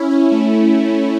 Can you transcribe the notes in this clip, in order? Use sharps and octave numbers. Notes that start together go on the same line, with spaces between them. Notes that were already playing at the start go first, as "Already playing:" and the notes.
Already playing: C#4 E4
C#4
A3